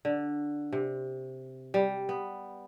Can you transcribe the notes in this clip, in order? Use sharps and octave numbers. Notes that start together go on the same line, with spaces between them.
D3
C3
G3
B3